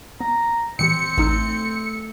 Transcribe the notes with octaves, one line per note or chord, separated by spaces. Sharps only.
B3 A#5
A#2 E3 C4 G4 C#7
A1 A3 D#4 E6